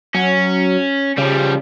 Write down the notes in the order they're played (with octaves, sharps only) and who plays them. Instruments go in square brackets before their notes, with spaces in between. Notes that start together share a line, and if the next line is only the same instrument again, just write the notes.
[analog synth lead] F#3 [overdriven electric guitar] C#4
[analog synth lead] C#3 [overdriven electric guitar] F3 G3